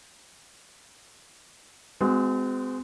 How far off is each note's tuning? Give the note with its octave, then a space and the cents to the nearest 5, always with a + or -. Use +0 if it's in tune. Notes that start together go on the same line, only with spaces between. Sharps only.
G#3 +0 C4 -40 F#4 +0